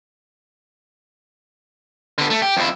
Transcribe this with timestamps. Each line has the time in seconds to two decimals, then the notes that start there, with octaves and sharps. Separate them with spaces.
2.18 D3 B3
2.30 A3
2.42 G4
2.57 F2 E4